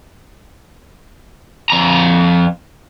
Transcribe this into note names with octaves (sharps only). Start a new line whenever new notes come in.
F2 A#5